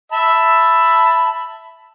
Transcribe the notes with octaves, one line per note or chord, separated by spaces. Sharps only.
E5 A5 B5